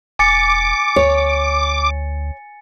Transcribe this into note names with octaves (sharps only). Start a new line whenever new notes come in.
E1 G#5 D6 A6 C#7
D2 C#5